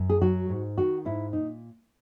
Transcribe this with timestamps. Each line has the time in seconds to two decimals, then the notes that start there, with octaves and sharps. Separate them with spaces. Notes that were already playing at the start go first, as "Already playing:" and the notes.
Already playing: F#2
0.10 G#4
0.21 F#3 F#4
0.49 G#2
0.78 D#3 F#4
1.05 G#2 E4
1.33 A#2 D#4